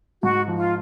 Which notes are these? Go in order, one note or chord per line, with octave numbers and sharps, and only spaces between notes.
G#2 F#4
F3
F4